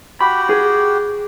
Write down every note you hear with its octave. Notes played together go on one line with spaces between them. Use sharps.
F#4 G4 G5 B5
G#4